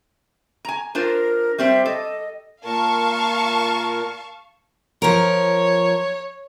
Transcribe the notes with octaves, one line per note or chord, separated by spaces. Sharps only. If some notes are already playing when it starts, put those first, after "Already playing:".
G#5 A#5
D4 F4 A#4 C5
G3 C4 C5 E5
A4 D#5
A#2 A#4 F5 A5 C#6
F3 A#4 C#5